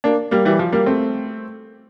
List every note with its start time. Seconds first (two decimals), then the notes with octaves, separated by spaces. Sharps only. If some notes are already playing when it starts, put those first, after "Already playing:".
0.04 A#3 D4
0.31 G3 A#3
0.45 E3 G3
0.59 F3
0.73 G3 A#3
0.86 A3 C4